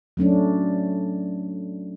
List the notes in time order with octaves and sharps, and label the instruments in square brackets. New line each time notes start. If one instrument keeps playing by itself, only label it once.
[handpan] F#3 A3 C#4 D4